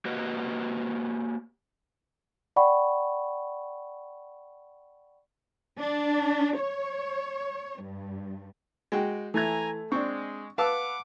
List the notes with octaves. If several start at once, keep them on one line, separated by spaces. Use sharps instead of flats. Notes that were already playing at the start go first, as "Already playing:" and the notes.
A#3 F#4 G4 B4 D#5
D5 F#5 G5 B5 C#6
D4
C#5
G2
G#3 F#4 G5
E3 A3 G#5 A#5 G#6
G#3 C4 D4 C#6
B4 F5 F#5 A5 D6 E6